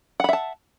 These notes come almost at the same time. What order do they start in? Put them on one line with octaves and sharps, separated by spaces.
F#5 B5 E5 A5